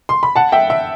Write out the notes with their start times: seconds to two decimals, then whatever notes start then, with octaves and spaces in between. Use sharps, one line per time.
0.09 C6
0.23 B5
0.36 F#5 A5
0.52 E5 G5
0.70 E5